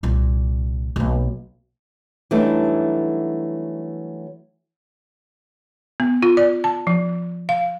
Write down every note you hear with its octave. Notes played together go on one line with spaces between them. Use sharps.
C2 A#2
B1 A#3
E3 F#3 G3 A3 D4 D#4
B3
F4
D5
A5
F3
F5